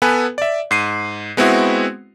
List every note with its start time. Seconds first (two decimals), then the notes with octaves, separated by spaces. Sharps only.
0.02 B3 A4 B4 G#5
0.38 D5 E5
0.71 G#2 C7 D#7
1.37 G#3 B3 C4 E4 F#4